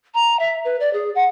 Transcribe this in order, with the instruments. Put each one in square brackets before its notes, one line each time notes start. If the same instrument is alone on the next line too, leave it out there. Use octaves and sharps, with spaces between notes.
[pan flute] A#5
E5
B4
D5
G#4
F#5